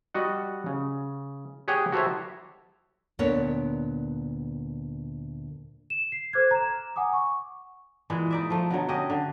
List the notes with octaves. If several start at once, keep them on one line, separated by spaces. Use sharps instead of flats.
G3 F#4 D#5 F#5
C#3
G4 G#4 C#5 F#5 G5
F#4 G4 A4 C5 C#5 E5
D2 A#2 B3 D4 A#4 C#5
E7
C7
A4 C5 D6 F6 F#6 G#6
A#5 E7
F#5 G#5 D6 D#6
C#6
A#2 E3 G#3
D#4 D5 E5
F3 A3
B2 D3 F#3
C#4 F#4 G4 D#5
D3